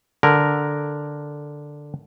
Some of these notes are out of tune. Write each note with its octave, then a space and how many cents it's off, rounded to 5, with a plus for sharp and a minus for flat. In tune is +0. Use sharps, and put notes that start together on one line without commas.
D3 +0 A#4 +0